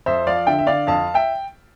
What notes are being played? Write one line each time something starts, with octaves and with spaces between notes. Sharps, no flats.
F2 C5 E5
F3 D5 F5
D3 E5 G5
E5
D3 D5 F5
F2 F5 A5
E5 G5